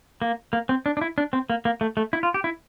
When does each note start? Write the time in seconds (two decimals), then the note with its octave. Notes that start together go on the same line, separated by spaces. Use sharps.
0.22 A#3
0.53 A#3
0.69 C4
0.86 D4
0.97 D4
1.01 E4
1.18 D4
1.33 C4
1.50 A#3
1.65 A#3
1.81 A3
1.97 A3
2.13 E4
2.23 F4
2.34 G4
2.44 E4